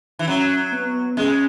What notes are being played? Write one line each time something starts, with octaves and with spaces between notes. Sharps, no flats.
E3
F#3 C#4
B3
G#3 C#4